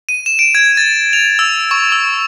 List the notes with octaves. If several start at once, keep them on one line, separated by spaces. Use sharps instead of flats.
D#7
E7
D7
G#6
A6
F7
E6
C#6
E6